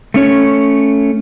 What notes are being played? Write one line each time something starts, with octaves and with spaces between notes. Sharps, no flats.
A3 C#4 C#5